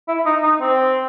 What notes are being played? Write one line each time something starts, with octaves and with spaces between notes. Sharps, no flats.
E4
D#4
D#4
C4